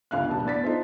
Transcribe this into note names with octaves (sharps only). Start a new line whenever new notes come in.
G1 C#2 F5 F#6
E1 G2 A5
E2 D5 A6 B6
D#4 F4 A4 C5